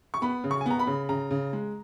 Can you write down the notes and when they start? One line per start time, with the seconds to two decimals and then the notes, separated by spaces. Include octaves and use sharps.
0.14 C#6
0.22 B3 B5
0.44 C#3
0.51 C#6
0.61 G#5
0.66 B3 A#5
0.79 B5
0.87 C#3
1.09 C#3 A#5
1.31 C#3
1.53 G#3